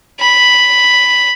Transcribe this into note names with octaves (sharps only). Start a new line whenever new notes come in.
B5